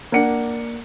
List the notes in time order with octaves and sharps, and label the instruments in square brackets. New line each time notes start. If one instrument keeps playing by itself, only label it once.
[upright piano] A#3 D4 F#5 C#7